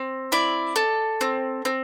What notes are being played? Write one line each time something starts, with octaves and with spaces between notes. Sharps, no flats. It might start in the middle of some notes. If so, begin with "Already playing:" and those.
Already playing: C4
E4 D5
A4
C4
C4